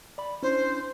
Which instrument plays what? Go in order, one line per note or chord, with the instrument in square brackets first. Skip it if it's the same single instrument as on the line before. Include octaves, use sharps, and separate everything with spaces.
[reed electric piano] D5 B5
[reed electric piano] C#4 D4 E4 [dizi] C5